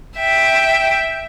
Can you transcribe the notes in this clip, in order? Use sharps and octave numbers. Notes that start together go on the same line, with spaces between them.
E5 G5